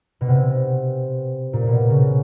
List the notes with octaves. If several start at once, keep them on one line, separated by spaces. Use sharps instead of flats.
B2
C3
A#2
B2
C#3